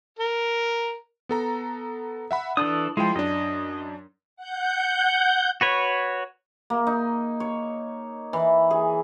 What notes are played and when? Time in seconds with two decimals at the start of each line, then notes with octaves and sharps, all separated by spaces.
0.19 A#4
1.29 B3 A4 A#5
2.31 E5 F#5 B5
2.57 E3 D4 A4 D#6
2.97 F3 G#3 E4 F4 G5
3.16 F#2 D4 D#5
4.36 F#5 G6
5.61 F#4 B4 C#5
6.70 A#3
6.87 D#4
7.40 C#5
8.33 E3
8.71 G#4